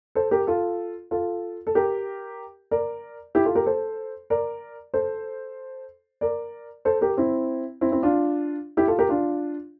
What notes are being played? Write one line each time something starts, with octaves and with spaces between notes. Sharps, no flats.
A4 C5
G4 A#4
F4 A4
F4 A4
A4
G4 A#4
A#4 D5
E4 G4
F4 A4
G4 A#4
A4 C5
A#4 D5
A4 C5
A#4 D5
A4 C5
G4 A#4
C4 E4
C4 E4
C4 E4
D4 F4
E4 G4
F4 A4
G4 A#4
D4 F4